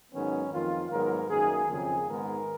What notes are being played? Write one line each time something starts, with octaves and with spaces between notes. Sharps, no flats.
G#2 D#3 F#3 B3 C#4
F2 D#3 A#3 F4
G#2 F#3 B3 A#4
F#2 D#3 A#3 G#4
F2 C#3 F3 A#3 G#4
G#2 D#3 G#3 B3 A#4